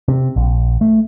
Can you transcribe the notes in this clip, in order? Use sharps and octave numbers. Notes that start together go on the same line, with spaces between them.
C3
A#1
A3